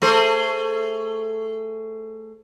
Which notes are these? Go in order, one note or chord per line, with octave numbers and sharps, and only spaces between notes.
A3 G#4 C5